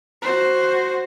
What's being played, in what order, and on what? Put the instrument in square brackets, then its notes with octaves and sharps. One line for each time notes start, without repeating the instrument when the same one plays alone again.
[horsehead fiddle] F#4 C5